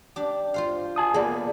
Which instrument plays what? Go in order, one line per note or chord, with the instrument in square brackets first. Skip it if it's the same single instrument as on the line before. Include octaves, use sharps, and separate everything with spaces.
[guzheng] D4 G4
F4 C5 F5
[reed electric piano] G#5 A5 D#6
[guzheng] A#3 B3 [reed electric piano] G#4 D5